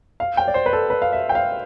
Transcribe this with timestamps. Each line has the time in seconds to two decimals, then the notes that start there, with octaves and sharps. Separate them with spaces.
0.20 F5
0.37 G5
0.48 D5
0.54 C5
0.66 B4
0.73 A4
0.90 B4
1.02 F5
1.13 E5
1.29 G5
1.35 F5